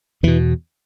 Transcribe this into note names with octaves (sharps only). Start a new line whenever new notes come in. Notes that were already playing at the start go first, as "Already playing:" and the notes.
E2 B2 E3